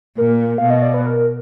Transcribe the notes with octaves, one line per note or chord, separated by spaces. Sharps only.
A#2 A#4
B2 F5
D#5
D5
B4
A#4